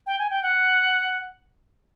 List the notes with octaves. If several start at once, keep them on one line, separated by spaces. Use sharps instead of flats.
G5
G#5
G5
F#5